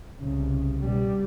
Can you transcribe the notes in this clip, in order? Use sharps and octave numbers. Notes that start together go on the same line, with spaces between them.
C2 C#3
B2 G3